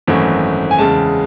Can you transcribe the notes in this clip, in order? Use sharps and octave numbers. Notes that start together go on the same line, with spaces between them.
G#1 F#2 E3 A3
G#5
E2 C#3 G#3 A5